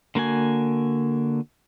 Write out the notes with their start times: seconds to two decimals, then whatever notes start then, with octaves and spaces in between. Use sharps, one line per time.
0.15 D3 A#3 F#4 G#5